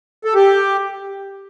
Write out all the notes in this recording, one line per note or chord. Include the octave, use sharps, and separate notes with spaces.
A4
G4